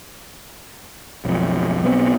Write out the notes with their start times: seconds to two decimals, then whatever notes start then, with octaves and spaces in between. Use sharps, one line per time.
1.25 B1 F2
1.83 B1 B3 C4